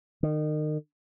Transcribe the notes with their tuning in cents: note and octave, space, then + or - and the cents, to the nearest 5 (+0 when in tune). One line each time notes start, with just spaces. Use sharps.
D#3 -30